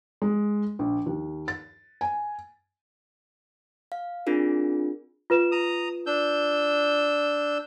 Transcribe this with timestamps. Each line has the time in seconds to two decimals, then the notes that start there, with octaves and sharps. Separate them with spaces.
0.22 G#3
0.79 A#1
1.06 D#2
1.48 A6
2.01 G#5
3.92 F5
4.26 C4 D4 F4 G#4 A#4
5.30 F4 B4 E7
5.52 A#5 D#6
6.06 D4 E6 G6